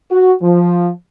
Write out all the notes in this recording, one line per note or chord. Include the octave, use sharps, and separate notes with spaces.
F#4
F3